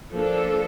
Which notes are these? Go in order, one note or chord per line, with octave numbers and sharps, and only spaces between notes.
F3 A#3 D4 A4